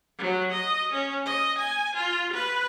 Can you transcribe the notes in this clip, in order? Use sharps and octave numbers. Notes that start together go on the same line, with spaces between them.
F#3
D#5
C#4
D#5
G#5
F4
B4